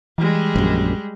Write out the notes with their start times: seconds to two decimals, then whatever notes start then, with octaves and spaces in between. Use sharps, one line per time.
0.18 E3 G3 G#3
0.56 A#1 F#2